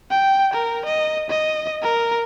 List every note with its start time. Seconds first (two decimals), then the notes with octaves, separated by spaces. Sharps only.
0.10 G5
0.53 A#4
0.85 D#5
1.30 D#5
1.82 A#4